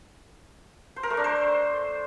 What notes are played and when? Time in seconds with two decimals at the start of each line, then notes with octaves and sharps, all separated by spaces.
0.96 C5
1.03 A#4
1.10 A3
1.17 D4
1.24 C5